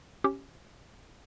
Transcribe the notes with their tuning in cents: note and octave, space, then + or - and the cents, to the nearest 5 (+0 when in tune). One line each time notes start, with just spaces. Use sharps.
C#4 +0 G4 +0